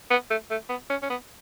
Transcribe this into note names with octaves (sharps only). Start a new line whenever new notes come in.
B3
A3
A3
B3
C#4
C#4
B3